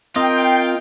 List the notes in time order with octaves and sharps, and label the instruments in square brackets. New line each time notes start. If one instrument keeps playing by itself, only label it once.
[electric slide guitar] C4 A#4 [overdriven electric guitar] F4 [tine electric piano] D#5 [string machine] G5